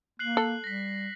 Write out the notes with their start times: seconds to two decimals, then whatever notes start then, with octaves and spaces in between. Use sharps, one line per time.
0.19 A#3 F#6 C7 F#7
0.37 A4
0.64 G3 A#6 B6